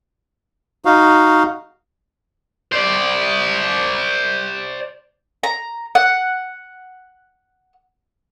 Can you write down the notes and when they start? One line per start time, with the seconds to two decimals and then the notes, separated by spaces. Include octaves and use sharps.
0.85 D#4 F#4 F5
2.72 C5 D5
5.43 A#5
5.95 F#5